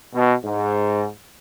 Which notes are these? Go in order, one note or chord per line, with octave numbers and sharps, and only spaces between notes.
B2
G#2